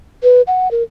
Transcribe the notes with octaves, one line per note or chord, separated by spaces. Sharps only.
B4
F#5
A#4